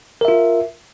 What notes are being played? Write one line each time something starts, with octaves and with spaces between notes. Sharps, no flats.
F4 A#4 E5